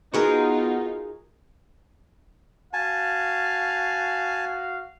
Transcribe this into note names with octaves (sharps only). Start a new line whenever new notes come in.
B3 D#4 F4 F#4 G#4 A#4
F#4 F5 G#5 A5